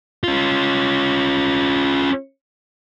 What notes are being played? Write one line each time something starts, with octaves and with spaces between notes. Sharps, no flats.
C#4 F4